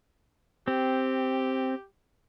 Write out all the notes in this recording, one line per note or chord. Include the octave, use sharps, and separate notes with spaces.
C4 G4